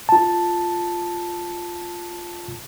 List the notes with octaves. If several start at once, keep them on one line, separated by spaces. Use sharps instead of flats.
F4 A5